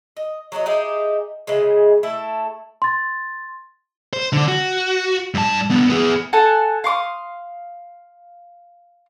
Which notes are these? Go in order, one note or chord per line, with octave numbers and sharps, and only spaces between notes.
D#5
F#3 F#4 C#5 D#5
D#4 E4 G4 G#4
C#3 E3 G#3
A3 E4 A4 E5
C6 A6
C5
D3 D4
F#4
G2 A5
D3 B3
B3 G#4
A4 F#5 G#5
F5 C6 C#6 D#6